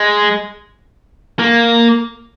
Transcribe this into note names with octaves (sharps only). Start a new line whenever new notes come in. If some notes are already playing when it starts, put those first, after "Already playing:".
Already playing: G#3
A#3